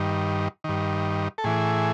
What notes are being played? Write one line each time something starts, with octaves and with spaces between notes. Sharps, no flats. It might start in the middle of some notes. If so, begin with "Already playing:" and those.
Already playing: G2 D#3
G2 D#3
A4
A2 E3 G#4